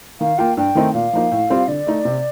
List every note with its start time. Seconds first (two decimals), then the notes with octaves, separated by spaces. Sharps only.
0.20 D#3 F5
0.38 A#3 F4 G5
0.57 G2 G5
0.75 D#3 A3 C4 D#4
0.94 A#2 F5
1.13 F3 A#3 D#4
1.31 A2
1.50 G3 C4 F4
1.68 D3 D5
1.87 A3 D#4
2.05 C3